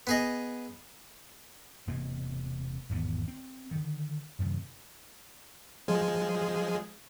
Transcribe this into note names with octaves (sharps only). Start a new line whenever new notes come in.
B3 G#4 D#5
E1 C3 A#3 C4
G#1 E2 D3 B3
C4
D3 D#3
F#2 C3 D#3
F3 G#3 G#4